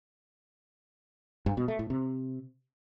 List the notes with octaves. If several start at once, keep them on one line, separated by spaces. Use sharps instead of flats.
G2
B2
A3
A2
C3